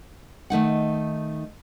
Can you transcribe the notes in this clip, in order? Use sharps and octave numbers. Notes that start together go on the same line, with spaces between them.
D#3 A3 D#4 F#5